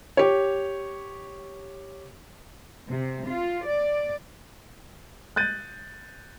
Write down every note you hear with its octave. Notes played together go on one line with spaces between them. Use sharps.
G4 C#5
C3
F4
D5
F#6 G6 A6 D#7